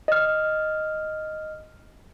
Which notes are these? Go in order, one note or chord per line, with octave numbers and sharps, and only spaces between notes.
D#5 F6